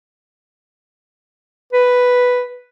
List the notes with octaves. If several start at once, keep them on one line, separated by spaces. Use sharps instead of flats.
B4